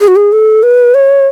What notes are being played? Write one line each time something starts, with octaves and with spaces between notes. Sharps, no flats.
G#4
F#4
G#4
A4
B4
C#5